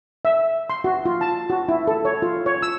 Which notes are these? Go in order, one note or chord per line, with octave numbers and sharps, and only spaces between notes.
E5
C6
F#4
F4
A5
F#4
E4
A4
C#5
F4
C#5
E6